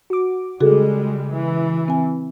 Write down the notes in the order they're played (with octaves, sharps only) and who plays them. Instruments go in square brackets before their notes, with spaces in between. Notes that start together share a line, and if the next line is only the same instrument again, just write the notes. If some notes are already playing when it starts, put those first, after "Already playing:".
[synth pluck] F#4 D6
[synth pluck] C#3 [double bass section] G3 G#3 [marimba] F#4 G#4 A4
[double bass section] E3
[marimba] C4 G#5